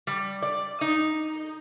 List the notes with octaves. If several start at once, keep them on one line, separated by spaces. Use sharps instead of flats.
G3
D5
D#4